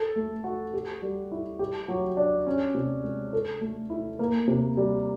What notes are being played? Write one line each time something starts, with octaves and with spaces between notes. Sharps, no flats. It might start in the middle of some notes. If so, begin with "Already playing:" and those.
Already playing: A4
A3
F#4
G4
G3
E4
G4
F#3
D4
C#4
C3
G#3
A4
A3
E4
A#3
C3
G3